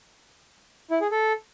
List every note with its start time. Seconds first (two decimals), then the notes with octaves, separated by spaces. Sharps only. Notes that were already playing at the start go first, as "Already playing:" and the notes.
0.90 E4
1.01 G#4
1.11 A4